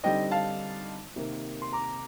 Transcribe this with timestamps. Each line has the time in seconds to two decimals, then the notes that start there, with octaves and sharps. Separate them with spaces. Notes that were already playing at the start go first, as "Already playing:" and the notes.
0.03 D3 G3 C4 D#4 D#5 G5
0.31 F5 A5
1.16 C3 D#3 A#3
1.62 C6
1.73 A#5 D6